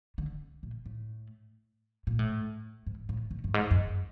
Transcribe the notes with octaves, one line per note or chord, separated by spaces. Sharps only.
D3
A#2
A2
A#2
A2
G#2
A2
B2
G2
G#2
F#2